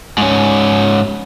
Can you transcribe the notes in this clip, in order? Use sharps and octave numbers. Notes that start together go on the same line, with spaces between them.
G#2 C#4